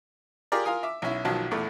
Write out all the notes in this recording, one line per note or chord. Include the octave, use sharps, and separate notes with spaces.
F4 G4 G#4 A#4 D5
F4 A#4 F5 G#5 D#6
E5 D6
B1 C#4 E4
B1 D#3 F3 F#3 A5
A#1 E2 A3